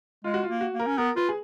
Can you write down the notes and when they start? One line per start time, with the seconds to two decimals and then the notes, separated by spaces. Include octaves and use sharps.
0.24 G#3 F4
0.34 F#4
0.43 F4
0.49 A#3
0.61 F#4
0.73 A#3
0.80 A#4
0.86 C#4
0.98 B3 A#4
1.16 F4 B4
1.29 G#4